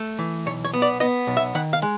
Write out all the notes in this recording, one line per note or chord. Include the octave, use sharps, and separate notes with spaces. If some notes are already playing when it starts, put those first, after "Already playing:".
Already playing: A3
E3
B1 C#5
C#5
B3
D5
B3 D#5
B1
E5
D#3 F#5
F5
G#3